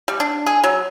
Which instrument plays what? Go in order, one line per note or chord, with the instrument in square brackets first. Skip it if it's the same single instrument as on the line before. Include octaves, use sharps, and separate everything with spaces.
[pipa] G3
D4
G#4
F#3